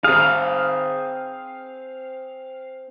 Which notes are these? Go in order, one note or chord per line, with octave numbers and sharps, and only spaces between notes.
C4 G#4 F5